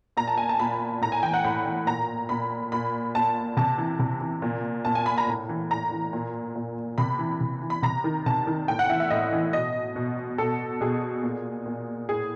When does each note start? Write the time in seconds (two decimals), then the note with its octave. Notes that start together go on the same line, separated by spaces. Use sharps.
0.17 A#2 A#5
0.28 A5
0.38 G#5
0.49 A5
0.59 A#2 B5
1.01 A2 A#5
1.12 G#5
1.23 E3 G5
1.34 F#5
1.44 A2 B5
1.66 E3
1.87 A#2 A#5
2.29 A#2 B5
2.72 A#2 B5
3.15 A#2 A5
3.57 C3 A5
3.78 E3
3.99 C3
4.21 E3
4.42 A#2
4.85 A#2 A5
4.95 G#5
5.06 B5
5.18 A#5
5.27 A2
5.49 E3
5.71 A2 A#5
5.91 E3
6.13 A#2
6.55 A#2
6.98 C3 B5
7.19 E3
7.40 C3
7.62 E3
7.70 B5
7.83 C3 A#5
8.04 D#3
8.26 C3 A5
8.47 D#3
8.68 A2 G5
8.79 F#5
8.89 E3 E5
9.00 E5
9.10 A2 D#5
9.32 E3
9.53 B2 D#5
9.96 B2
10.38 B2 A4
10.81 B2 G#4
11.23 A#2
11.66 A#2
12.09 A2 G#4